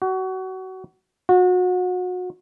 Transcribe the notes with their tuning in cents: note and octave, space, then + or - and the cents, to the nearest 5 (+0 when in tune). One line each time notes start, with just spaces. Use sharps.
F#4 +25
F#4 -30